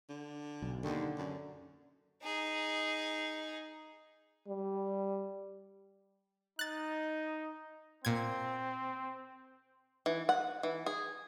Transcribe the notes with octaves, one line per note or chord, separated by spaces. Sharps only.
D3
B1
D#2 D3
F#2
D#4 G#4
G3
D#4 F#6 A6
A#2 C4 G#6
E3
F#5
E3
G#4